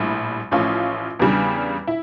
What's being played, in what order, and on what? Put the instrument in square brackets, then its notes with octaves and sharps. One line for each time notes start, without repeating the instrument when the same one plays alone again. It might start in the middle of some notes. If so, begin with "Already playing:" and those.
Already playing: [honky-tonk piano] A#1 A2 G3
A1 A2 F3 C#4 F4
E2 C#3 G3 D4
E4